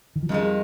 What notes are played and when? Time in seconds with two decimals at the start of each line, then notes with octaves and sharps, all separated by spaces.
0.16 D#3
0.23 F3
0.29 F2 D#3 G3 G#3